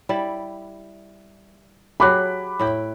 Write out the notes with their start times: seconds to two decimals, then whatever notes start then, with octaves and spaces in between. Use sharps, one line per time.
0.09 G3 E4 D5
2.00 F#3 G4 G#4 B5 D6 F#6
2.59 A2 E4 G5